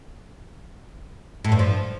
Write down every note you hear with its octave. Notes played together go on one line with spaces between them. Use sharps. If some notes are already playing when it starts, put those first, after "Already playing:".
A2
G2
F3